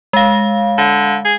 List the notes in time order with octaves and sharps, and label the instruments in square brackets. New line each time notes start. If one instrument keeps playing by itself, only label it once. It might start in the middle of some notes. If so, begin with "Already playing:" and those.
[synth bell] G#3 F5
[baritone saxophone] D3
G#4